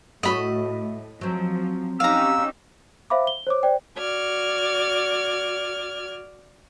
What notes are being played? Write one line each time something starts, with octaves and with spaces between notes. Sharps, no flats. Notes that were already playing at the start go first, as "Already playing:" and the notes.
A2 A3 F#4 C#5 D#5 B5
F3 F#3 C4
C#4 D#4 G4 F5 A#5 E6
C5 E5 F5 B5 D6
G7
C5 C#5 D6
C5 D5 G5
F#4 D5 F6 G#6